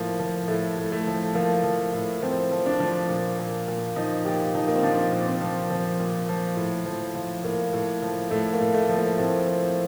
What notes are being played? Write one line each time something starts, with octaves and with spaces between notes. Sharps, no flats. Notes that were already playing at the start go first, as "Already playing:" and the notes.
Already playing: A2 F3 A#3
F3
A2 A3
A2
A3
F3
F3 A#3
F3
A2
F3 C4
F3
D4
F3
A#2
A#2
A#2
F3 D#4
A#2 G4
F3 D#4
A#3
C4
F3 D4
A#2
C4
F3
F3
A#2
F3
A2
F3
F3
A2 A#3
A2
F3
A2 A3
A#3
A2
A3
F3
A#3
A2 C4
F3